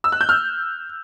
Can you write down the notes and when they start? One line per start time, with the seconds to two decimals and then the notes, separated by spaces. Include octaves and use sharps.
0.04 E6
0.12 F#6
0.21 G6
0.29 F6